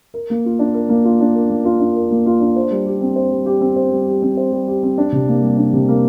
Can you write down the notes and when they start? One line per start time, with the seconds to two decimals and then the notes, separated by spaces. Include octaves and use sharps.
0.14 A#4
0.30 A#3
0.45 F4
0.59 D4
0.74 A#4
0.89 A#3
1.04 F4
1.20 D4
1.35 A#4
1.50 A#3
1.65 F4
1.80 D4
1.96 A#4
2.11 A#3
2.26 F4
2.40 D4
2.56 C5
2.71 G3
2.86 G4
3.01 C4
3.16 C5
3.31 G3
3.46 G4
3.61 C4
3.76 C5
3.92 G3
4.07 G4
4.22 C4
4.37 C5
4.52 G3
4.68 G4
4.83 C4
4.98 D4
5.12 C3
5.28 A#3
5.42 G3
5.57 D4
5.73 C3
5.89 A#3